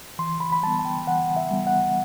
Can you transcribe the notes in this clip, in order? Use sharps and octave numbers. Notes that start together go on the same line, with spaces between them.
E3 C6
B5
B5
G3 B3 A5
A5
G5
E3 F#5
E5
G3 B3
F#5